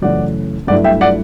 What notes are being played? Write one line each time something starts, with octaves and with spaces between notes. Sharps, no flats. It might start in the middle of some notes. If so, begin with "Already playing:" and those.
F#2 C#3 E3 A3 C#4 D5 F#5
G2 F#3 A3 E4 D5 F#5
E5 G5
D5 F#5